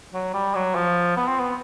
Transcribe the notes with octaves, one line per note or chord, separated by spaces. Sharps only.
F#3
G3
F#3
F3
B3
C4
B3